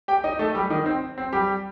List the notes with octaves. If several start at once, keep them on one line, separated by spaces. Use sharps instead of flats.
G4 G5
D#4 D#5
A3 A4
G3 G4
D#3 D#4
C4
C4
G3 G4